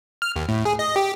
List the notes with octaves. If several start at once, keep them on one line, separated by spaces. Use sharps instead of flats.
F6
D#2
A2
G#4
D#5
G4